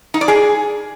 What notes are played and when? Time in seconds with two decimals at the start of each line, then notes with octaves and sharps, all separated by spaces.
0.14 D#4
0.21 D5
0.28 G#4